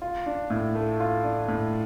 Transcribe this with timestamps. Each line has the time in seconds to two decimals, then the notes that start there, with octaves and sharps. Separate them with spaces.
0.02 F4
0.26 D4
0.50 A2
0.75 A3
1.00 F4
1.24 D4
1.48 A2